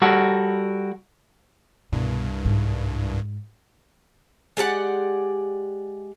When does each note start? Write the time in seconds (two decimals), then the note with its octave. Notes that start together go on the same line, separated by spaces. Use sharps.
0.02 G3 F#4 A4 A#4
1.92 C2 G2 B2
2.45 G#2
4.57 G#3 G4 D5 F#5